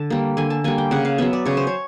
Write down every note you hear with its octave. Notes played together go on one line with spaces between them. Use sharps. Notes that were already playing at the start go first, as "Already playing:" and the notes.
Already playing: D3 A5
G3 A#3
D3 G#5
A5
G3 A#3 G#5
G5
C#3 F#5
F5
F#3 B3 E5
D5
C#3 C#5
C5
C#5